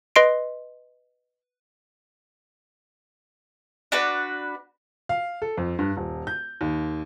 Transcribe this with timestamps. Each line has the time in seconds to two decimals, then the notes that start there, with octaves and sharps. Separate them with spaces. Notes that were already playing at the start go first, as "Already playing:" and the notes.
0.16 B4 D#5 C6 C7 D7
3.92 D4 F#4 B4
5.09 F5
5.42 A4
5.57 F2
5.79 G2
5.97 D#1
6.27 G6
6.61 D#2